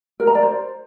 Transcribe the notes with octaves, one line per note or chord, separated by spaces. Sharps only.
A#4
A#5
D5
C5